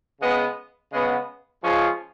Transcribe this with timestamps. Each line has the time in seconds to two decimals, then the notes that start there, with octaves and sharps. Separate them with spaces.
0.20 C#3 G#3 B3
0.92 C#3 G#3 B3
1.63 F3 G#3 C#4 F4 G#4